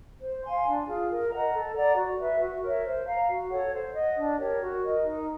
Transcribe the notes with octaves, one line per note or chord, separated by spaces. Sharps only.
C5
F5 G#5 C6
D4
F4 G#4
A#4
D#5 F#5 A#5
A4
D5 F#5 A#5
F#4
B4 E5
F#4
A#4 C#5 E5
C5
F5 A#5
F#4
A4 C#5 F#5
C5
D#5 F#5
D4
G4 A#4 C#5
F#4
A#4 D#5
D#4